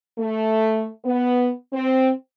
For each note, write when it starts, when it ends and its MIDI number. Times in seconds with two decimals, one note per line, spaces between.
0.18 0.86 57
1.05 1.51 59
1.73 2.12 60